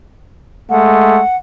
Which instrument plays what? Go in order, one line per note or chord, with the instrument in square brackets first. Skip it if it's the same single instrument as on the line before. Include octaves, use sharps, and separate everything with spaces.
[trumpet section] G#3 A3 [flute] F#5